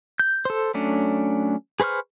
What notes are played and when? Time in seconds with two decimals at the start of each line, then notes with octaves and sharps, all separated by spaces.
0.20 G6
0.45 A4 C5
0.74 F#3 A3 C#4 D4
1.80 G#4 B4 C5 C#6 F6